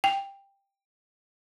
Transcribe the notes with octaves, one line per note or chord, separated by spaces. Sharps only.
G5